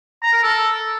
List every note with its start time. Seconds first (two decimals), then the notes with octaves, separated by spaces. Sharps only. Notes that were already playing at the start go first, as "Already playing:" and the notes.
0.22 A#5
0.33 A#4
0.43 A4